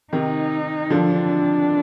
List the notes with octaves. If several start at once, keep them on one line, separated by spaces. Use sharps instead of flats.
C3 D#3 D#4
D3 F3 D4